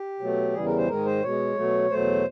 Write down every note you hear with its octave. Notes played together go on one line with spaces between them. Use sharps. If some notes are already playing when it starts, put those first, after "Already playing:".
Already playing: G4
B2 F#3 A3
E2 C#3 E3 G3 G#4
A#4
C5
G#2 D#3 G#3 A#4
C5
B2 G#3 C#5
B2 F#3 A3
E2 B2 F#3 A3 C5